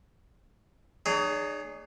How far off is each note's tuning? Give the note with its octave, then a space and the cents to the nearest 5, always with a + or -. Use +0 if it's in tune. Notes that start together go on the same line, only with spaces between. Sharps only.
D#4 -45 G#4 +0 C#5 +35